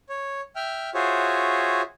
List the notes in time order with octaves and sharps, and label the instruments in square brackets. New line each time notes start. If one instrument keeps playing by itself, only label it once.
[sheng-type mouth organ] C#5
E5 G5 F6
F4 F#4 G#4 C5 C#5 E5